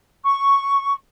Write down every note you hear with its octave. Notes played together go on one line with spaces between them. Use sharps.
C#6